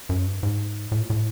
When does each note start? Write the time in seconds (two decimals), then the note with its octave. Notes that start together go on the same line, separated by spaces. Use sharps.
0.09 F#2
0.26 G2
0.43 G#2
0.92 A2
1.00 A#2
1.10 A2